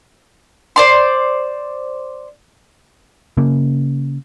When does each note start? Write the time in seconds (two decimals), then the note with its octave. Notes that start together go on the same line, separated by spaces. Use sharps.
0.76 C5 D5 C6
3.37 C#3 A#3